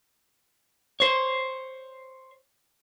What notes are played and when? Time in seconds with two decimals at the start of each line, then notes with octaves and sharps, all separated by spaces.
1.00 C5 C#5